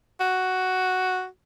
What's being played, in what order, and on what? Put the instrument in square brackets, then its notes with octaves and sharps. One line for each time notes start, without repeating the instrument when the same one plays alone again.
[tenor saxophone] F#4